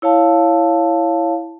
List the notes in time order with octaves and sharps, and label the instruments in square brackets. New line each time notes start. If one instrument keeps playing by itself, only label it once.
[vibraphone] E4 C#5 F5 A5